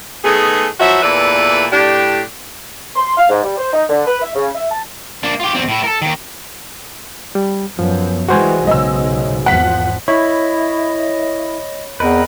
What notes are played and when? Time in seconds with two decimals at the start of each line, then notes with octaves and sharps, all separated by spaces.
0.24 D#3 A3 B3 G#4
0.80 F3 F#3 E4 F#4 E5
1.03 E2 A#2 A4 B4 D5 E5
1.72 A2 D4 G4
2.96 C6
3.17 F5
3.30 G#2
3.43 G3
3.58 C5
3.73 D#4
3.89 D3
4.07 B4
4.22 E5
4.35 C#3
4.55 E5
4.71 A5
5.23 A#3 D4
5.40 F4 G4
5.54 E2 C4
5.68 A2 E4
5.84 A4 A#4
6.02 D#2 D#3
7.35 G3
7.79 F#2 F3 B3
8.29 E3 G3 G#3 F#4 C5 G#5
8.67 B1 G#2 C#3 D#5 E6
9.46 G#1 E2 F3 F#5 B6
10.08 E4 C#5 D#5 B5
12.00 E2 C4 A#4 B4 D#5